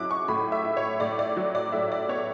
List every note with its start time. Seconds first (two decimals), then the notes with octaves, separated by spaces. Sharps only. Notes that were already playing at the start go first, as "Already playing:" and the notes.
Already playing: F#3 E4 D6 F#6
0.11 C#6
0.28 A2 B5
0.52 E5
0.65 E4
0.77 C#5
1.00 A2 D5
1.19 D5
1.37 F#3
1.55 D5
1.72 A2 E5
1.92 D5
2.09 B3 C#5